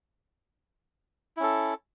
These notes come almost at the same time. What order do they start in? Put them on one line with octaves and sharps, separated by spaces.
E4 C#4 A4